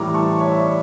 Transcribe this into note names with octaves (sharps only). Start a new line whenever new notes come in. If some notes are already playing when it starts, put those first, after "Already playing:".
Already playing: A2 E3 G3 A#5 D6
A5 C#6
C#5 E5
D5